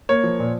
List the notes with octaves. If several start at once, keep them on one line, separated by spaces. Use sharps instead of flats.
A#3 C#5
F3
A#2